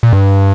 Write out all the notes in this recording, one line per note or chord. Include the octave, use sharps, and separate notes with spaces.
A#2
G2